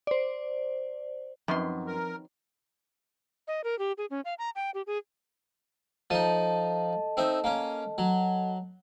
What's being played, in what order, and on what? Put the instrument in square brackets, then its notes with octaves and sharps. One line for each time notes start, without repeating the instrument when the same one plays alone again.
[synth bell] C5 D5
[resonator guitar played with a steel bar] F#2 [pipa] D#3 B3 C6 [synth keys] F3 C4
[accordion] A#4
[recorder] D#5
A#4
G4
G#4
C#4
F5
A#5
G5
G4
G#4
[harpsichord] F3 D#4 [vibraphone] A4 D#5 A5
[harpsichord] C4 D#4 E5
A#3 C#4
F#3